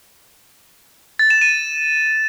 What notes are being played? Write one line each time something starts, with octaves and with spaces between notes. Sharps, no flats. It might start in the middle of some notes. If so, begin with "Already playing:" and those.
A6
E7
D#7